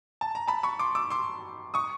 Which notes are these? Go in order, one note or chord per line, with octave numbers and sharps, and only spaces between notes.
A5
A#5
A5 B5
B5 C#6
C6 D6
D6 E6
C6 D6
C#6 D#6